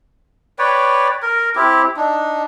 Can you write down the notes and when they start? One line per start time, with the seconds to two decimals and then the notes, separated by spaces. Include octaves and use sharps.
0.59 B4 C#5 D5 G5
1.23 A#4
1.56 C4 E4 G4
1.97 D4 D#4